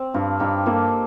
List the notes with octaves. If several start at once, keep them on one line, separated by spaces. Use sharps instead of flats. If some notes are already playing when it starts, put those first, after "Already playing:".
Already playing: C4
G2 D4 F4
G2 D#4 G4
A#3 F4 A4